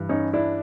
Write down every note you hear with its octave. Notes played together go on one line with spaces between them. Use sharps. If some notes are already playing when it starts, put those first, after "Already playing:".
Already playing: G2 E3
C#4 D#4
D4 E4